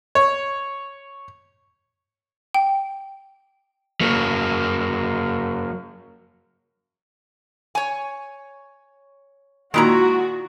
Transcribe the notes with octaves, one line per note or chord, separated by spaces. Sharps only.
C#5
G5
F#3 A#3
C#5 G#5
A#2 D#3 G#3 E4 F#4 A#5